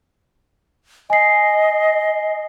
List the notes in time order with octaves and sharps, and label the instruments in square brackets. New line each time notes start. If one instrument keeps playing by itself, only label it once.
[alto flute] D#5 [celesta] G#5 C7